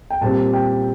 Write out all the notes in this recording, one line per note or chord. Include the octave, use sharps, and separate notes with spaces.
G5
A#2 G3 C4 A5
G5